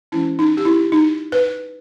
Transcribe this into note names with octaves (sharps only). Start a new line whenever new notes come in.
E3 G#3 C#4 E4
D#4
G4
E4
D#4
B4